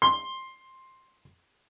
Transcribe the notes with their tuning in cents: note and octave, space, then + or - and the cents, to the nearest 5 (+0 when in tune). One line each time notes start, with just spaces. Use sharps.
C6 +10